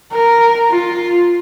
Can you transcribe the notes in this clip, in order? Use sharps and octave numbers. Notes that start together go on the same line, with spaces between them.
A#4
F4